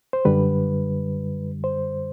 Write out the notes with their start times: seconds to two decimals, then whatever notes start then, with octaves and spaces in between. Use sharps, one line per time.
0.13 C5
0.25 F#2 D3 G3 B4
1.64 C5